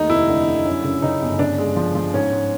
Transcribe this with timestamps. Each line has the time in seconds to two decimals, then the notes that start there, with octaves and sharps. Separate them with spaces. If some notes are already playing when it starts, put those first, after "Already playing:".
Already playing: D#2 A3 D#4
0.10 F1 E4
0.28 D3
0.46 D3
0.66 F#2
0.84 C#3
1.02 C#3 D#4
1.21 G1
1.39 C#3 D4
1.58 G#3
1.76 F3
1.95 F3
2.14 G#2 C#4
2.32 G#2